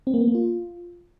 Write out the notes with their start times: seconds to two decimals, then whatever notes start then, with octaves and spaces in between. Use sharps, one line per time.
0.07 C4
0.14 A#3
0.21 B3
0.28 A#3
0.35 F4